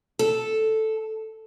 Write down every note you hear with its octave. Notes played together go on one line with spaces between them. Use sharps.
A4